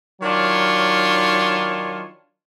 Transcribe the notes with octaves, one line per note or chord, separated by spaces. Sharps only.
D#3 F#3 D4 F4 C#5